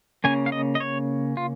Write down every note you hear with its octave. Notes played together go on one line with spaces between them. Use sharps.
C#3 A#3 C#4 G#5
F5
D#5
D#5
C#5
F4